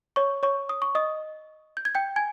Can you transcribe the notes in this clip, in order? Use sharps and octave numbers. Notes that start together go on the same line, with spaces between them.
C#5 C#6
C#5 C#6
D#6
C#6
D#5 D#6
G6
G#6
G5 G6
G#5 G#6